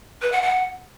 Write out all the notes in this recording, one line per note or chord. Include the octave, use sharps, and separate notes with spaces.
B4
F#5
F#5